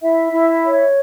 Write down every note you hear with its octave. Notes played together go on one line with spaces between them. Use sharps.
E4 E5
E4
C#5